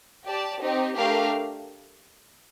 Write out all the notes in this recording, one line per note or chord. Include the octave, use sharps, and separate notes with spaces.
G4 D5 A5
C4 D#4 G4
A3 D4 G4 A#4 F5